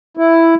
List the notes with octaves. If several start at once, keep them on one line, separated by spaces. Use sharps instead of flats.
E4